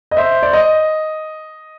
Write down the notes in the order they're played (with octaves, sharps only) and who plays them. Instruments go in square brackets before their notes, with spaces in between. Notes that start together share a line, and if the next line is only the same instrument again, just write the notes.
[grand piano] D#5
[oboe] C5 [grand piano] E5
[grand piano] D5
D#5